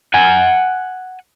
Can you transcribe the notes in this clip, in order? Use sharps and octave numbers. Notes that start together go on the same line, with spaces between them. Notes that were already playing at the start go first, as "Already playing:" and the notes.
F#5 G#5